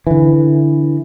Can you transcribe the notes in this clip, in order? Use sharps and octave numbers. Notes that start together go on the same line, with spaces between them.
D3 E3